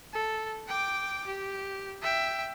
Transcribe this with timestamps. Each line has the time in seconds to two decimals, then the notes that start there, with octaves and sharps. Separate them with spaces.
0.14 A4
0.68 G5 D6
1.27 G4
2.03 E5 G5